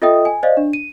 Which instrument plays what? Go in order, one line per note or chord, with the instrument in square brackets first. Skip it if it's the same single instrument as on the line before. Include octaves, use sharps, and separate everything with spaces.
[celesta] F4 A4 D#5 E5 G5 D#6
G#5
C5 D5 D#5 F5
D4
D#7